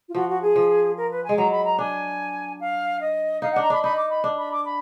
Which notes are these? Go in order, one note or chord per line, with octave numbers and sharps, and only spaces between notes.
F4
F3 F#4
F#4
G#4
F3
A#4
B4
G#3 G#5
F#3 A#5
B5
A#5
D4 G#5
F5
D#5
D#4 F5
D4 F#5
A#5
D4 B5
D#4 B5
D6
B5
D4
B5
D6
B5